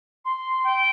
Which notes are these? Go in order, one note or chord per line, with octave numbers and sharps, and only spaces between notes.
C6
G5